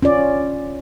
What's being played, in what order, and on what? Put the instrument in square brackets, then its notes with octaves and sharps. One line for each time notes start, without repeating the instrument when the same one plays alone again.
[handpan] C#4 F4 D5